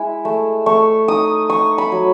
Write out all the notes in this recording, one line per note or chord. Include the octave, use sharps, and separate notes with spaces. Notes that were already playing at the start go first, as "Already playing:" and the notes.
Already playing: G#3 E4
A3
A3 C#6
D#4 D#6
D#4 C#6
B5
F#3